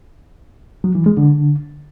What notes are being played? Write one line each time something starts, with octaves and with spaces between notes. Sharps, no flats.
F#3
E3
G#3
D3